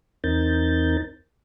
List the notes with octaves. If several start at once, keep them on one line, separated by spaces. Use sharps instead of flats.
E2 C4 D#4 A#4 G6 A6